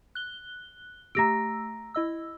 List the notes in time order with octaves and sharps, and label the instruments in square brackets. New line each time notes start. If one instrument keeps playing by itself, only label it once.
[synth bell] F#6 G7
[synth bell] A3 G4 E6 [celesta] A#5 A#6 D7
[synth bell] E4 D#5 E6